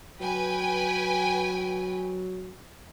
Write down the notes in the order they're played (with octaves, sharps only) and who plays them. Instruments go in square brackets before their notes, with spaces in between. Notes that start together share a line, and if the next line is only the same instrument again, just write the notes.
[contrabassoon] F#3 [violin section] B4 G5 G#5